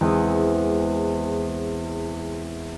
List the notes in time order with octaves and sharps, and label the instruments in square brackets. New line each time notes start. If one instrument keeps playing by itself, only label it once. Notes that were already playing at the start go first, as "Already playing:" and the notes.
[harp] E2 G#3 C4